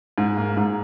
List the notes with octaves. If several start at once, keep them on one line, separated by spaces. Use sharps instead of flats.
G#2
A#3
G#2